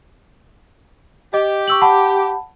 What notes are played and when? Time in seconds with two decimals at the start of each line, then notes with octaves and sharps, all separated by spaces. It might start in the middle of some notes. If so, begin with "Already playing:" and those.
1.34 G4 D#5
1.68 C#6 E6 F#7
1.82 F#5 A5 B5